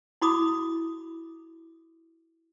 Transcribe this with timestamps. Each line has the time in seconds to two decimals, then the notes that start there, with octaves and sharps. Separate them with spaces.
0.21 E4 F#4 B5 D6 D#6